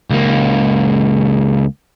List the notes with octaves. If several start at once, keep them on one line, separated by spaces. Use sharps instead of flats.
C#2 A#3